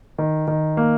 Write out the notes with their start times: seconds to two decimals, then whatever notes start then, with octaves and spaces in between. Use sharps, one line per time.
0.18 D#3
0.48 D#3
0.77 A#3